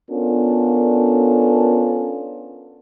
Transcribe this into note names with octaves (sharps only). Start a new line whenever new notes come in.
B3 C#4 D4 F4 A4 A#4